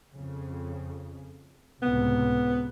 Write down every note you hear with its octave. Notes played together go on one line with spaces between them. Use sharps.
F2 C#3
C#2 A2 C3 B3